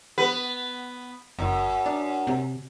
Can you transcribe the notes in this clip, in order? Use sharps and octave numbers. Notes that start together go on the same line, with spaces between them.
B3 B4
F#1 F#2
D4
C3